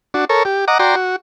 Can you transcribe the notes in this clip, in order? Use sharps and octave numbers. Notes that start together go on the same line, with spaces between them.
D4 F#4
A4 A#4 C#5
G4
D#5 F#5 A#5 D6
F#4 D5 G5 A#5 C6
F#4